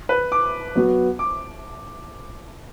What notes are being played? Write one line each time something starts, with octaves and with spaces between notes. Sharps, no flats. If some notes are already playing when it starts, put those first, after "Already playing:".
B4
D6
F#3 B3 F#4
D6